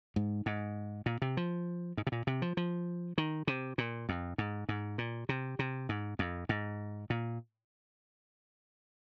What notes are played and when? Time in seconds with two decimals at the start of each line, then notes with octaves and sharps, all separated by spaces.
0.16 G#2
0.46 G#2
1.06 A#2
1.22 C3
1.37 F3
1.97 G#2
2.07 C3
2.12 A#2
2.27 C3
2.42 F3
2.57 F3
3.18 D#3
3.47 C3
3.78 A#2
4.09 F2
4.38 G#2
4.69 G#2
4.98 A#2
5.29 C3
5.59 C3
5.89 G#2
6.19 F2
6.49 G#2
7.10 A#2